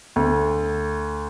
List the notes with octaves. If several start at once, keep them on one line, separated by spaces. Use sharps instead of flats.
D2